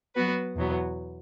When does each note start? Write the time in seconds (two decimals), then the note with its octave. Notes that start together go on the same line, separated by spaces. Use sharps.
0.16 F#3 B3 F#4 B4
0.56 E2 B2 F#3 B3